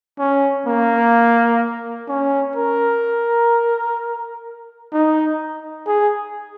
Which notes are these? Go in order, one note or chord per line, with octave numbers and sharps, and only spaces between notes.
C#4
A#3
C#4
A#4
D#4
G#4